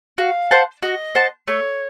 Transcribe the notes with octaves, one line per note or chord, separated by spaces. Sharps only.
F#4 F5
C5 F#5 A5
F#4 D#5
C5 F#5 A5
A3 C#5